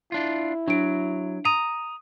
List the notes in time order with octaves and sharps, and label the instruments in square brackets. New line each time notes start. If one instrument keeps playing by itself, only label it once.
[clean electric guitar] D4 F4 [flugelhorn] E4
[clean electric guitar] F#3 [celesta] D4 D7
[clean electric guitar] A#5 [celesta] D#6 D#7